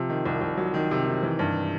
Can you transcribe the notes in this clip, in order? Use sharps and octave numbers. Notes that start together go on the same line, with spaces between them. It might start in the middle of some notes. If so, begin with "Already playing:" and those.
Already playing: C3 F3
D#3
C2
C2
F#3
D#3
C3
D#3
E3
G2